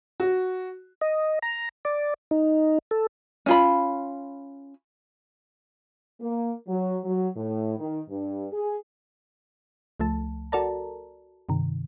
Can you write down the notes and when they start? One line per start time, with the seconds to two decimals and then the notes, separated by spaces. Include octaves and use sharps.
0.20 F#4
1.01 D#5
1.42 A#5
1.85 D5
2.31 D#4
2.91 A4
3.46 C#4 F4 B5
6.20 A#3
6.67 F#3
7.04 F#3
7.35 A2
7.79 D#3
8.09 G2
8.51 G#4
10.00 C#2 F3 A3 A5
10.52 F#4 A4 A#4 D5 A5 A#5
11.49 G2 C3 D#3